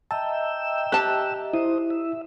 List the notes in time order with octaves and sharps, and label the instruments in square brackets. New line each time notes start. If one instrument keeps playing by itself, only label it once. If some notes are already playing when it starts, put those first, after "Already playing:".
[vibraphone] D#5 E5 A#5 [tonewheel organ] G5 E6 [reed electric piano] A5
[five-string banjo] G4 A5 [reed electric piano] F#6
[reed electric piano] E4 [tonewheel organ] C5 D#6
[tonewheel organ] E5